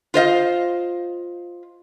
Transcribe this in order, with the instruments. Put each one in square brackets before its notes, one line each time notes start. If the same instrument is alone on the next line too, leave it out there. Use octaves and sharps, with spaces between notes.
[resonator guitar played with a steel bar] F4 C5 D#5 F5